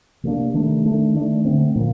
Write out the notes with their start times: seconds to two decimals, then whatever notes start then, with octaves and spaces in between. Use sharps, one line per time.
0.23 C3 G3 A#3 D4
0.54 C3 D#3 A3 D4
0.85 D#3 A3 D4
1.15 D#3 A3 D4
1.45 D3 A3 C4
1.76 A#2 F3 A#3